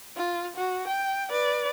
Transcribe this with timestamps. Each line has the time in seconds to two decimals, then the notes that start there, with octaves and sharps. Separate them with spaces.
0.17 F4
0.56 F#4
0.88 G5
1.30 B4 D5